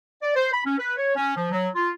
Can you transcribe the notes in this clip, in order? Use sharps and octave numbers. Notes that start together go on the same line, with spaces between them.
D5
C5
B5
C#4
B4
C#5
C#4
F3
F#3
F4